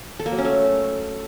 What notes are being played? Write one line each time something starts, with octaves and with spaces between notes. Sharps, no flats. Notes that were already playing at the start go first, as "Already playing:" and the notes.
A4
A#3
F#3
C#4
A3